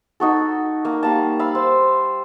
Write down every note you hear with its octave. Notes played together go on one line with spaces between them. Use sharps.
D#4 F#4 A4
A#3
G3 A#3 A5
F5 B5 E6
C5